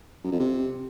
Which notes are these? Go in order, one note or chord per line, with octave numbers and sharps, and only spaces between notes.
F#2
F2
C3